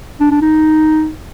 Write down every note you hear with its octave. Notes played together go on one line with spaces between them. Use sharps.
D4
D4
D#4